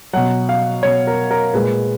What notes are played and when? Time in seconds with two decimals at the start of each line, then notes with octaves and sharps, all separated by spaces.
0.13 B2 F#3 F#5
0.49 F5
0.83 B2 F#3 C#5
1.07 A#4
1.31 A#4
1.54 A#2 G#3 B4